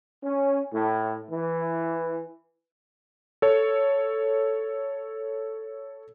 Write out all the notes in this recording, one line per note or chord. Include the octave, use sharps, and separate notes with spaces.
C#4
A2
E3
A4 C#5